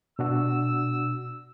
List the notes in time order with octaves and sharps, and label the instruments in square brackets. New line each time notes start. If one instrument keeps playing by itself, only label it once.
[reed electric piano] B2 D4 F#4 [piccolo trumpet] E6